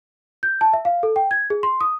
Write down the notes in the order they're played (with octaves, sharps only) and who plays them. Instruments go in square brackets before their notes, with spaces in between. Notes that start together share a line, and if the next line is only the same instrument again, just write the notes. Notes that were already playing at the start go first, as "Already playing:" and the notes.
[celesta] G6
A5
E5
F5
A4
G5
G#6
G#4
C6
D#6